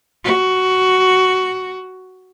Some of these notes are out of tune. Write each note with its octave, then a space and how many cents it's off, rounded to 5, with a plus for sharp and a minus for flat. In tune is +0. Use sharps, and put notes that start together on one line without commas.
F#4 +10